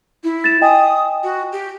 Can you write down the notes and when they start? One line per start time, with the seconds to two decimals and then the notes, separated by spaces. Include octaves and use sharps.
0.23 E4
0.44 A6 E7
0.61 D#5 G5 G#5 D#6
1.23 F#4
1.52 G4